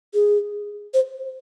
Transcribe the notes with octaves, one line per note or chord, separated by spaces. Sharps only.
G#4
C5